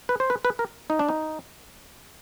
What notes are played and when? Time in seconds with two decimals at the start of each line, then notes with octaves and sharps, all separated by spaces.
0.09 B4
0.20 C5
0.30 B4
0.45 B4
0.59 A#4
0.90 D#4
0.99 D4
1.09 D#4